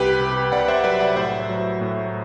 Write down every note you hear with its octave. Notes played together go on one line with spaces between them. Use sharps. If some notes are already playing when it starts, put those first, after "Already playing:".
Already playing: C2 G4 B4
C3
C2 D5 F#5
C5 E5
F#3 B4 D5
D5 F#5
A2 C5 E5
F#3
A2